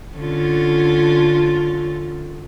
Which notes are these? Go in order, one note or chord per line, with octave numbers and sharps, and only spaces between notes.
D3 C#4 F4